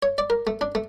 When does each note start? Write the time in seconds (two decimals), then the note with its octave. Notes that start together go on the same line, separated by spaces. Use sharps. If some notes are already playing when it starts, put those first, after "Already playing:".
0.03 C#5
0.18 D5
0.30 A#4
0.47 A3
0.61 D4
0.75 A3